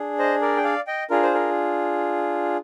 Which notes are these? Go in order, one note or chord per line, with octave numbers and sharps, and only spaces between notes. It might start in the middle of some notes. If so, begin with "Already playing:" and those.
Already playing: D4 G#4
C5 D#5
A#4 D5
G5
D5 F5
D#5 G5
D4 F4 G#4 A#4
C5
A#4